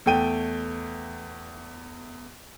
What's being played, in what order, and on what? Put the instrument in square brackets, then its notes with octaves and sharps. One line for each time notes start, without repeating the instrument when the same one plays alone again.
[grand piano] E2 A3 G5 D#7